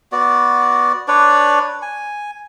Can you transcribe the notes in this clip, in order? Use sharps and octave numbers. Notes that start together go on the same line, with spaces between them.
B3 F#4 D5
D4 B4 C#5 D5
G#5